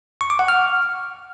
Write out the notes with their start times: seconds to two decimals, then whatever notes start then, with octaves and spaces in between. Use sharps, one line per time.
0.21 C#6
0.30 D6
0.39 F#5
0.48 F6